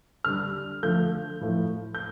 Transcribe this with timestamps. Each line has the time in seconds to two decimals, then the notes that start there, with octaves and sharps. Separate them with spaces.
0.24 D3 G3 F6
0.83 D3 F3 A3 G6
1.41 A2 F3 A3
1.95 G6